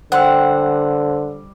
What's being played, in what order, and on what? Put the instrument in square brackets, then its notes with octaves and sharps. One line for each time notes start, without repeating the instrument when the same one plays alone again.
[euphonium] D3 [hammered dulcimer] G3 [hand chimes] C5 C6 E6 [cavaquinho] F#5